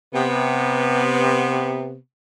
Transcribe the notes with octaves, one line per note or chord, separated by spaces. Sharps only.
C3 B3